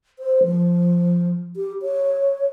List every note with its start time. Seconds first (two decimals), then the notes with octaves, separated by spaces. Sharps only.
0.19 C5
0.44 F3
1.56 G4
1.82 C#5